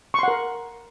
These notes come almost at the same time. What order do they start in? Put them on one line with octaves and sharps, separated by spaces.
C#6 C6 F#5 A#4